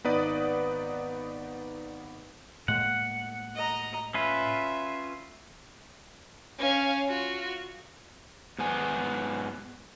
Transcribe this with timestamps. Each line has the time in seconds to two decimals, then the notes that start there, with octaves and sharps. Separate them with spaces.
0.04 G#1 B3 D#4 B4 D5 D#6
2.68 A2 G#3 A#3 F#5
3.55 D#5 A#5
4.14 C#4 F4 B4 E5
6.58 C#4 F5
7.07 F4 F#4
8.58 G#2 B3 G#5